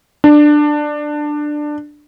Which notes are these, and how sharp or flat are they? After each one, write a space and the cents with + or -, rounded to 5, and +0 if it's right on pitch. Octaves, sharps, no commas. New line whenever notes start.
D4 +15